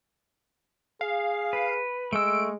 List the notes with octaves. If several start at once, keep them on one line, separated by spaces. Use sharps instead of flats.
G#4 F5
B4
G#3 A3 E6 D7